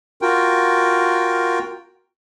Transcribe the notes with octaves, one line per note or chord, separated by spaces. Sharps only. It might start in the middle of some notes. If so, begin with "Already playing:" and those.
F4 F#4 A#4 G5